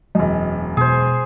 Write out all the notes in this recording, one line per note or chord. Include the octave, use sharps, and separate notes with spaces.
E1 F#2 D#5
B2 G#4 C5